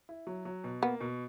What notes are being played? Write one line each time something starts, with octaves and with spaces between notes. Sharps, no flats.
E4
F#3
F#3
B2
A#3 B3
B2